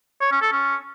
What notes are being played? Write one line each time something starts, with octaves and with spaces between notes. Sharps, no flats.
C#5
C#4
A4
C#4